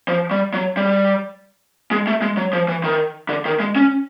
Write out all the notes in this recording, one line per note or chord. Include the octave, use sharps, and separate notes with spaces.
F3
G3
F#3
G3
G#3
A3
G#3
F#3
F3
E3
D#3
D3
D#3
G#3
C#4